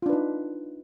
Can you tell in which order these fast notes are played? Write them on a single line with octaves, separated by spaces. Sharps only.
F4 D4 B4 D#4